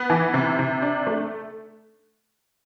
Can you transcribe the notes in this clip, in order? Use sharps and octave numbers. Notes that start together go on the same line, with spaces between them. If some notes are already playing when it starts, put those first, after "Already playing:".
Already playing: B3
E3
C3
C3
D4
A3